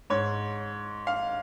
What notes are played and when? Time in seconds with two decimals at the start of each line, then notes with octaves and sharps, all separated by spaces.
0.10 G#2 C#5
1.07 F5